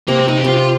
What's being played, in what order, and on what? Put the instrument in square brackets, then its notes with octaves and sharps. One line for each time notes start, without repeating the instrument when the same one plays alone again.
[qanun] C3 [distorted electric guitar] A#3
[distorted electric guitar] C4
[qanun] C3 [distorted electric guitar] D#4
[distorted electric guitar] G4
[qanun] C3 [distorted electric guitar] F4
[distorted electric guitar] F4